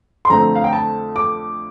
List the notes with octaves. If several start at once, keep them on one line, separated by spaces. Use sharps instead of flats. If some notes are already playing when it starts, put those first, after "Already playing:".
C6
F2 D3 A3 C4 A#5
F5
G5
A5
D6